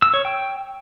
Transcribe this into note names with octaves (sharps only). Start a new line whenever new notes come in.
E6
C#5
G5